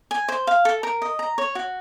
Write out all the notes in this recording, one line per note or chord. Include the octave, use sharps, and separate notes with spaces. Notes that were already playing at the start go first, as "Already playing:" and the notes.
G#5
C5
F5
A4
A#4
D#5
A#5
C#5
F#4